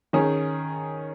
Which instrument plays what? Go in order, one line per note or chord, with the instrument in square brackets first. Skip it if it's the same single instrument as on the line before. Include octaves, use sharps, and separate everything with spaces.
[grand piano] D#3 C#4 G#4